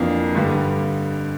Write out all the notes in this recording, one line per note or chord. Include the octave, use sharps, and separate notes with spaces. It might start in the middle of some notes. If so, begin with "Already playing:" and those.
Already playing: F2 E3 A#3 D4 F4
G2 D3 G3